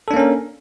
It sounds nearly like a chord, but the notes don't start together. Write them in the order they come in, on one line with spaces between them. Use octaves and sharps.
A4 D4 A#3 C#4 A#4